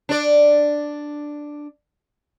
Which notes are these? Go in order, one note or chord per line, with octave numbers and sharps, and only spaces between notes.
D4 D5